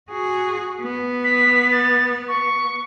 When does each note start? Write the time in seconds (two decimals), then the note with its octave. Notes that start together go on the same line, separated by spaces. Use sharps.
0.11 F#4 G#4
0.81 B3
1.24 B6
1.72 A6
2.28 C#6